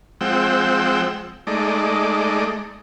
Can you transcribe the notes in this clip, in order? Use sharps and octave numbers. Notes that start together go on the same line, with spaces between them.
F3 G#3 C4 F#5 G5 E6
G#3 A3 D#4 D5